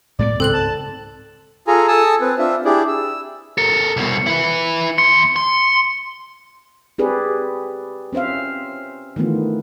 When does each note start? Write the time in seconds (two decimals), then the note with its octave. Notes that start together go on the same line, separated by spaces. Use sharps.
0.19 A2 G#3 B3 D5
0.40 C#2 G#2 C4 A4 F#6 F#7
0.53 A5
1.67 F4 G#4 A4 G#5 A#5
1.88 A4 G#5 A5 D#6 E6
2.21 C4 B4
2.39 C4 D4 F4 E5
2.65 D4 E4 G4 G#4 D5
2.88 E6
3.58 A4 A#4 C#7
3.97 C2 B2
4.27 E4 B4
4.98 E2 C6 C#7
5.36 C6
6.98 C4 G4 G#4 B4 D5
8.13 C4 C#4 C5 E5 F5
9.16 D#3 E3 A3 B3 F4